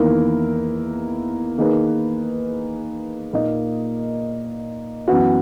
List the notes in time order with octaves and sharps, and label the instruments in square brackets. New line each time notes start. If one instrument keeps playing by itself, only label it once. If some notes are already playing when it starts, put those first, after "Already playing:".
Already playing: [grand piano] E2 D#3 A#3 E4 A#4
D#3 A#3 D#4 G#4 B4
A#2 A#3 D#4 A#4 D#5
F#2 E3 B3 F#4